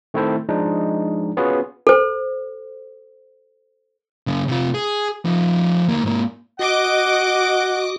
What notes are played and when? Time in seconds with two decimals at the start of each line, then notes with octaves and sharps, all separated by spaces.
0.14 D#3 A3 C4 E4 A4 C5
0.49 F3 G#3 D4 D#4
1.37 B3 C#4 F4 F#4 G#4 B4
1.87 A4 C5
4.27 F#2 C#3
4.48 C3 F4
4.74 G#4
5.25 F3 D#4
5.88 D2 A#3
6.03 G#2 A#3
6.59 F#4 D#5 F#5 D6